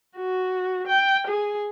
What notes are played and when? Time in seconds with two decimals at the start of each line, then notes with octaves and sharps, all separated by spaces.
0.17 F#4
0.88 G5
1.27 G#4